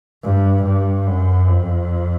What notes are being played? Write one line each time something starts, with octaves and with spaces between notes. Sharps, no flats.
G2
G2
F#2
F2